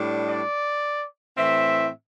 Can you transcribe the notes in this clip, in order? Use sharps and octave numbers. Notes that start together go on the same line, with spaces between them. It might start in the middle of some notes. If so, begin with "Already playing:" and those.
Already playing: A2 G3 D4
D5
A2 E3 C4 E5